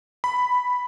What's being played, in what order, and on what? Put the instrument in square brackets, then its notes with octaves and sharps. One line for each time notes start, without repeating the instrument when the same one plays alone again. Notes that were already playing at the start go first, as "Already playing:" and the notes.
[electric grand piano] B5